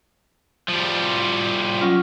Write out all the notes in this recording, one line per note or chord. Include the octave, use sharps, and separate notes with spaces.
F3 G3
F#3 C#4 F4